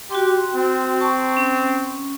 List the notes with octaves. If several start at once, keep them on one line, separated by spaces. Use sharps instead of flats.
F#4 G4 G5 C6
C4
A5 C#6
C#4